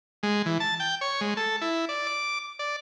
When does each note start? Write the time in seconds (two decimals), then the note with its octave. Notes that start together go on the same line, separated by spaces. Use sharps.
0.23 G#3
0.46 E3
0.60 A5
0.80 G5
1.01 C#5
1.21 G#3
1.37 A4
1.61 E4
1.89 D5
2.07 D6
2.59 D5